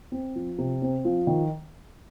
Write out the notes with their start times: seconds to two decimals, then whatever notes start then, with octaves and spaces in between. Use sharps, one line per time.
0.12 C4
0.36 F3
0.58 C3
0.82 C4
1.05 F3
1.27 D#3